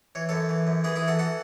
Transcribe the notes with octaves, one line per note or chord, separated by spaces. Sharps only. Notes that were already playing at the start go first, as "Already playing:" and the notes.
E3 C#5
F#2 A4 C#5
E3
F#2
E3 G#4 B4
E4 G#4
E3
F#4 A4
E3 F#4 A4